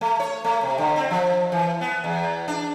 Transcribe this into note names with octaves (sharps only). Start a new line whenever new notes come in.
A3
C#5
A3
C3
D3
C4
F3
E3
B3
E2
D4